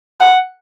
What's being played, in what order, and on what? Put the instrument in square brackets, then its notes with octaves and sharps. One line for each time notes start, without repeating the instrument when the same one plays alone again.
[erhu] F#5